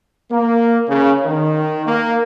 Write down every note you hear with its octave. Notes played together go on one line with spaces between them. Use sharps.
A#3
C#3
D#3
A#3